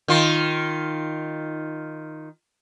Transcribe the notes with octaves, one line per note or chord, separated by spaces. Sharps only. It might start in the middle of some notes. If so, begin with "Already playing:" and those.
D#3 F4